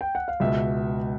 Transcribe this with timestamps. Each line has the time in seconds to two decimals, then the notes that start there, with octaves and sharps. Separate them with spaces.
0.01 G5
0.15 F#5
0.28 F5
0.40 C#2 B2 E5